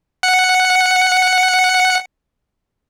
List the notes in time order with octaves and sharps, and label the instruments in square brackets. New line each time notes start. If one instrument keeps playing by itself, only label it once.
[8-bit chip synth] F#5 C#7